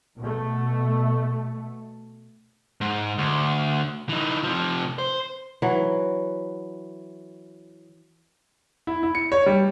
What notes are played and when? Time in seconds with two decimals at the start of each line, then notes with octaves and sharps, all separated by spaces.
0.20 B2 A3
2.81 G#2
3.18 D2
4.09 E3 D#4
4.43 C3 F3
4.99 C5
5.62 E3 F#3
8.87 E4
9.03 E4
9.15 C#7
9.32 C#5
9.46 G3